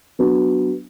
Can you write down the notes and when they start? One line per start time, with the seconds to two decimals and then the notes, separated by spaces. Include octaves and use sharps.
0.19 F#3 B3 D4 F#4